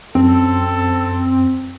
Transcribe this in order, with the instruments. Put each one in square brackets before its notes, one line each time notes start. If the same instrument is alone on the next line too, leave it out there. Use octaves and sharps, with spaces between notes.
[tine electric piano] F#2 [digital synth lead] C4 [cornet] A4